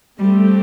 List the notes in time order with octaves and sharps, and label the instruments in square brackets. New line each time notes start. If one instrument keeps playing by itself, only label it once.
[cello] G3 [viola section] A3 C4 G4